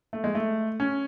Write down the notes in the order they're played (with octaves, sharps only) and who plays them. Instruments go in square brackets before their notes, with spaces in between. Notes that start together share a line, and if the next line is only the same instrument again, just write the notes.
[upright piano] A3
G#3
A3
C#4